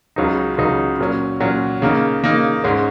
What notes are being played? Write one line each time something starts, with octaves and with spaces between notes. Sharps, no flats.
C#2 C#3 F#3 D#4
C#2 C#3 F#3 D#4
A#2 F#3 C#4
A#2 F#3 C#4
C#3 A#3 D#4
C#3 A#3 D#4
G#2 G#3 C#4